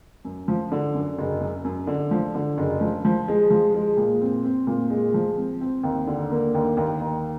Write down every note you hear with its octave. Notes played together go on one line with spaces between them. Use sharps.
F#2
F3
D3
F#2
F#1
F#2
F#2
D3
F3
D3
F#1
F3
F3
G#3
F3
G#3
A#2
C4
C4
A#2
G#3
F3
C4
C4
D#2
D3
A#3
D#2
D#2
D#2